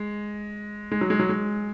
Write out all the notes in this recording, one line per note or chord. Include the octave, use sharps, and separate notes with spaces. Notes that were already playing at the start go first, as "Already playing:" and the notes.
Already playing: G#3
G#3
F#3
G#3
F#3
G#3